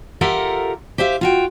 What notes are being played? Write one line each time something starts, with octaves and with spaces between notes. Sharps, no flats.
F4 G4 A4 A#4 E5 F#5
G4 C5 E5 F5
F4 F#4 G5